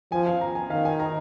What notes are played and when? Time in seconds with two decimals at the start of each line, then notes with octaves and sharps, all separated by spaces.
0.12 F3 G#5
0.26 F5
0.41 A#5
0.55 G#5
0.70 D#3 F5
0.85 G#5
0.99 A#5